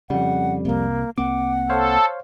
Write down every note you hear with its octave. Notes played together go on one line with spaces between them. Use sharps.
F2 C#3 G3 F#5
C2 C3 A#3
C2 A#3 C4 F#5 D6
A4 C5 C#5 F5